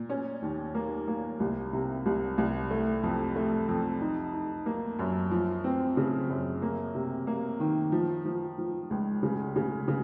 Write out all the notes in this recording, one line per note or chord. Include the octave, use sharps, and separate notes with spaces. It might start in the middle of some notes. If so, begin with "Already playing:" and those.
Already playing: A#2
C#4
D#2
A#3
A#3
C2
C3
C2
C2
A3
F2
A3
F2
D#4
D#4
A#3
F#2
F3
C4
C#3
F#2
A#3
C3
A#3
D#3
F3
F3
F3
C#2
C#3
C#3
C#3